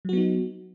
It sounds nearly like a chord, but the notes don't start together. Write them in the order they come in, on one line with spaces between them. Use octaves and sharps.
F#3 F#4 B3 D#4